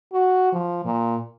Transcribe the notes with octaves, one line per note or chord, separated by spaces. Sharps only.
F#4
F3
A#2